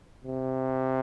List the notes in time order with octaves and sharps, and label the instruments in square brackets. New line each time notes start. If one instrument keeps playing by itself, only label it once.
[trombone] C3